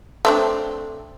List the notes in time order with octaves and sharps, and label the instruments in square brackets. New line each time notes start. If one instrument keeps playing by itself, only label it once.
[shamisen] A3 C4 D4